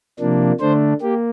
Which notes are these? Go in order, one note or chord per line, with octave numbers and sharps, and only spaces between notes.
C3 F3 A#3 D4
D3 A3 D4 C5
A#3 G4